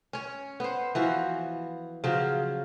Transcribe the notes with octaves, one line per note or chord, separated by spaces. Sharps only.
C#4 C#5
B3 C5
E3 F3 F#4
C#3 F3 F#3